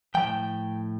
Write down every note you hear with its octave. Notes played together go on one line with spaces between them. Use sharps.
F3 G5
A2